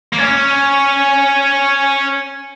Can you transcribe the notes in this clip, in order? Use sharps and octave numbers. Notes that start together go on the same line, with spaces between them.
A#3
C#4